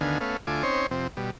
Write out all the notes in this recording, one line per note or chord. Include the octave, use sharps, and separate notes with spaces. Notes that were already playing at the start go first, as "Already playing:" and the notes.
D2 D3 D#3 B3 F5 G#5
A3 B3 C#4 F5
D2 A3 F4 G#5 D6
C4 C#4 D#4 C5 C#5
F2 C3 C4
B2 G3